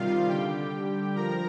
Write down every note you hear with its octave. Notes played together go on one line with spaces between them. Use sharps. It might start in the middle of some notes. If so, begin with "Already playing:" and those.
Already playing: C3 D#3 G3 F4 F5
D3 G3 G4 G5
F3 A#4 A#5